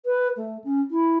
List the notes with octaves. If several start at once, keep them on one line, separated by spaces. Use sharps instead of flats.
B4
A3
C#4
E4